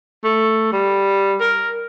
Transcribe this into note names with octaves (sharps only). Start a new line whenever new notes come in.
A3
G3
A#4